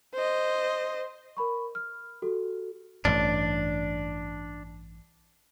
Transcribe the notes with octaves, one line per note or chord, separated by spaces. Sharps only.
C5 D#5
A#4 B5 C#6
F6
F#4 G4 A4
A1 G2 D4